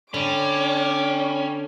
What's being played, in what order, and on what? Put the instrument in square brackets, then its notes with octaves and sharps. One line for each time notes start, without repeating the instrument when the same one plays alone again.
[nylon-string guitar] D3 [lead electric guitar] C#4 [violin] D5 D6 [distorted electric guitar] G5 B5